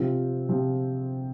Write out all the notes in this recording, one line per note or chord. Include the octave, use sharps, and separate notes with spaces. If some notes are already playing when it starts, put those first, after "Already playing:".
Already playing: C3 F3 C4 F4
C3 F3 C4 F4